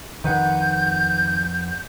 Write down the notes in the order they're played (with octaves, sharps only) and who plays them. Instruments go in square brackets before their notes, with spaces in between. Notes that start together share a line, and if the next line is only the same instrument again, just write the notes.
[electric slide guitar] F2 B4 F#5 [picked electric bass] D#3 [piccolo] G6